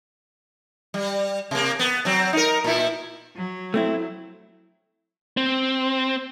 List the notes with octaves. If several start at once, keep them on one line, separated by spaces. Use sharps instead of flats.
G3
C3 A#3
B3
F#3 C4
D#4 A#4
A#2 E4
F#3
A3 C4 E4
C4